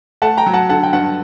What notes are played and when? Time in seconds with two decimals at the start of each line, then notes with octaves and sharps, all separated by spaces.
0.22 A3 F#5 A5
0.37 G5 A#5
0.46 F#3
0.53 F#5 A5
0.69 D3 F#5 A5
0.83 G5
0.93 G2 F#5 A5